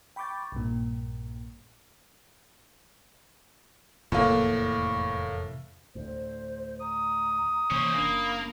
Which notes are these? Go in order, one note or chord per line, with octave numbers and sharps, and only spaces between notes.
G5 B5 C#6 D6 G6 A6
A#1 G2 A#2
F1 E2 A2 A#3
D2 A2 C5
A#5 D#6
C3 E3 A#3 C#4 C5
F#1 A#3 C#4 D4 B5